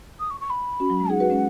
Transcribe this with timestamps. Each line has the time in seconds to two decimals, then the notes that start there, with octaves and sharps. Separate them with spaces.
0.19 D#6
0.30 C#6
0.40 C#6
0.50 B5
0.80 C#4 F#4
0.90 F#3
1.00 G#3
1.10 D#4 G#4 F#5
1.20 F#4 B4
1.30 G#3 C#4